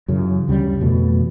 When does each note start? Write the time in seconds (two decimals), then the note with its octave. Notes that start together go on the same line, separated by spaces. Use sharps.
0.08 F#2 C#3 E3
0.48 D2 C#3 G3
0.81 F2 B2 E3 A3